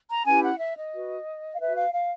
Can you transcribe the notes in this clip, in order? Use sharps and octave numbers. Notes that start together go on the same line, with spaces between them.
A#5
C#4 E4 G4 B4 G#5
F#5
E5
D#5
F#4 B4
F5
F#4 B4 E5
F5
F5